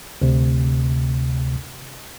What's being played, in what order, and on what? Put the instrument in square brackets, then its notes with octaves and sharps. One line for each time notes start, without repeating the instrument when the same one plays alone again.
[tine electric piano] D2 C3